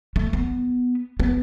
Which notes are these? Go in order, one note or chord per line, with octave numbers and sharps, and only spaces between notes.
A3
B3
B3